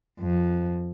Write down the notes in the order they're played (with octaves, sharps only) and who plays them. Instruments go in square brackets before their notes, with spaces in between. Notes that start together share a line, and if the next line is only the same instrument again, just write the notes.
[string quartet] F2